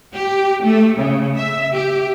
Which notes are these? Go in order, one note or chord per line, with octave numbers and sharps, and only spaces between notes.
G4
A3
C#3
E5
G4